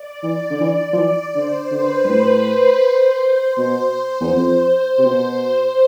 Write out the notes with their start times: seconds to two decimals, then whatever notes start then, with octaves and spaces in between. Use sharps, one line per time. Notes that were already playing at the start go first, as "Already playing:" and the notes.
Already playing: D5
0.23 E3
0.50 D3
0.60 E3
0.93 F3
0.97 E3
1.35 D3 C5
1.71 D3 B4
2.04 G2
2.09 A2 C5
2.47 C5
2.84 C5
3.57 B2
4.21 E2
4.33 F2
4.99 C3
5.06 B2